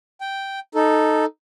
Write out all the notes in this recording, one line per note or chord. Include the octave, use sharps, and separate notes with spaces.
G5
D#4 A4